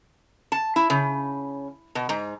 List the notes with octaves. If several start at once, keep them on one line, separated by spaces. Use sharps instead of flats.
A5
E4
C#3
B2
G#2